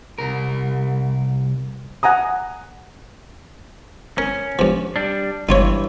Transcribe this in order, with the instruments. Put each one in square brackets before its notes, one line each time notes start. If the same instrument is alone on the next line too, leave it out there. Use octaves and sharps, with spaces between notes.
[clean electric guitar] C2 A#4
[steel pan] F#5 G#5 A#5 D#6
[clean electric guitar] C#4 [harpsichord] A#4
[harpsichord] G2 F3
[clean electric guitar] G3 D4
[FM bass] G1 [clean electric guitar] G2 E3 [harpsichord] D#4 F4 C#5